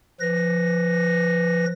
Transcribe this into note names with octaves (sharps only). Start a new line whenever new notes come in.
F3 B4 A#6